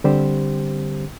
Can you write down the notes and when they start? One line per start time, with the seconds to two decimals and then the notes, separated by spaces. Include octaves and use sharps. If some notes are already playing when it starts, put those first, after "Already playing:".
0.04 D3 G3 C4 G4 C5